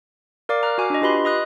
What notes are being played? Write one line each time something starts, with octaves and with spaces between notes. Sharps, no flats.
A#4 D5 F5 D6
A#5 F6 F#6
F#4 G#5 D6
D4 D#5
F4 G4 B4 D#5 B5 C6
D#5 D#6 F#6